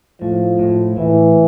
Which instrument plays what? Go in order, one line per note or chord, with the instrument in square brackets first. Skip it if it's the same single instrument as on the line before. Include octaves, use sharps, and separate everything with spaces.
[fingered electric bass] A2 [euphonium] F3
[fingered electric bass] A2
[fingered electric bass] A2 [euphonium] E3